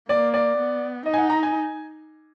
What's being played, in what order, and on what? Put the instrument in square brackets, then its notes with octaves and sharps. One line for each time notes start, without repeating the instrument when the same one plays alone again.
[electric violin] A#3 [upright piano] D5
[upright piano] D5
[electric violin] B3
[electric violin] D#4 [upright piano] D#5
[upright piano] G#5
F#5
A#5
G#5